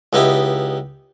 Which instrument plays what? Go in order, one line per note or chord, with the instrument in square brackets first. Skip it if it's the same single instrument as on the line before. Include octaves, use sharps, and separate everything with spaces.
[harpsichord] C#2 B3 D#4 E4 G4